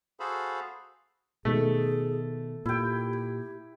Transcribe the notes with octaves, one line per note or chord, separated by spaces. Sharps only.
F#4 G#4 A4 C5 F5 B5
B2 D#3 A3 G#4
A#2 E4 G4 G5